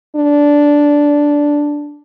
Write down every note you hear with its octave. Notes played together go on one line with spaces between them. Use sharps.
D4